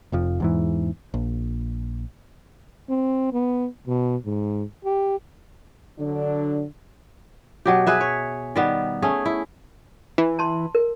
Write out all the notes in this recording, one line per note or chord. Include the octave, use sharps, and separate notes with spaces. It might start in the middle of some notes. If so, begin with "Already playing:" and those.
F1 F2 F3
E2 G#2 E3
A#1
C4
B3
B2
G#2
G4
D3 F#3 D4
B2 F#3 G4
G#4 B4 E5
C#5
D#3 G3 B3
A3 C#4 G#4
E4
E3
A5 C6
A#4